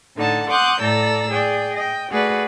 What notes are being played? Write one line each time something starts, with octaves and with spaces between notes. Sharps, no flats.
A2 D3 D#4 F#5 A5
F#5 C6 D6 D#6 F#6 G6
A2 A4 D5 A#5 E6
G#4 D5 G5
D#5 G5
A3 F#4 G#4 B4 D5